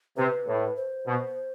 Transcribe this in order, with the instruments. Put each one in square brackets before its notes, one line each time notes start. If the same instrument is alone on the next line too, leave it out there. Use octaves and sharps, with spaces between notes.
[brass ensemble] C3 [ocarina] B4
[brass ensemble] A2
[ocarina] C5
[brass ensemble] B2